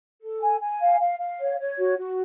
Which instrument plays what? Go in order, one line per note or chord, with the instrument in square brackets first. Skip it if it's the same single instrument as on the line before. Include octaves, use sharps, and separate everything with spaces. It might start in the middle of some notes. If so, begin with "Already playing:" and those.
[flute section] A4
G#5
G#5
F5
F5
F5
C#5
C#5
F#4
F#4